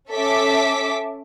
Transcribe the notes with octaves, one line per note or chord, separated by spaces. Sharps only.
C#4 A4 E5 D6 B6